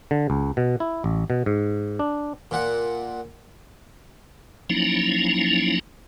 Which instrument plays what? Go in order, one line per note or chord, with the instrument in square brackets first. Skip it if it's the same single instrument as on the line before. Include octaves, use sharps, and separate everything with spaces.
[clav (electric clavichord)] D3
C#2
B2
E4
A1
B2
G#2
D4
[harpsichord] A#2 F#5
[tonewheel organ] F3 F#3 A#3 C#4 D#4 E4